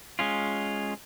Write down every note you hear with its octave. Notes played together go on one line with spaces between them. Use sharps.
G#3 C#4 F4